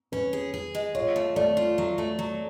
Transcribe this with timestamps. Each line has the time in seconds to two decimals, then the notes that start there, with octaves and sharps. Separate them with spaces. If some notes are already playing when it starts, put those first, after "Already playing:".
0.12 C#4 B4
0.33 G#4
0.54 G#4
0.75 G#3
0.95 F4 C#5
1.16 A3
1.36 A3 D5
1.57 F4
1.78 F#3
1.98 A3
2.19 F#3